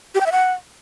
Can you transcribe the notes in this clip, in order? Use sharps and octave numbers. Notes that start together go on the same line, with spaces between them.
G4
G5
E5
F#5